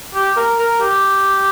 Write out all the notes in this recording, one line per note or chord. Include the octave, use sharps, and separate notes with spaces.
G4
A#4
A#4
G4